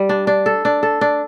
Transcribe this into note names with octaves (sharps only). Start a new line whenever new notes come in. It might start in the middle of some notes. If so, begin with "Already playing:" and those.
Already playing: G3
D4
D4
A4
D4
A4
D4